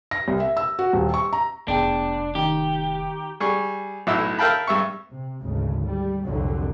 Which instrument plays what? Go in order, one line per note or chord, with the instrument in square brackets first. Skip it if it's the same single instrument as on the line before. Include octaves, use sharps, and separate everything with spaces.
[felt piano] A#6
C2
E5
E6
F#4
D#1
C#6
A#5
[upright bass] F1 [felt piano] E2 G5 [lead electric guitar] D4
[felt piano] D#3 [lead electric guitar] G4
[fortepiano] G3 G#4 C#6
B1 A2 E4 E6
A#4 E5 F5 G5 A5 B5
G2 E5 C#6
[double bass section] C3
G#1 D2 C#3
G3
C2 F2 D3 F#3